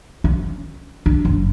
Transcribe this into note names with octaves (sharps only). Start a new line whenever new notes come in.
C#4
D4
F#1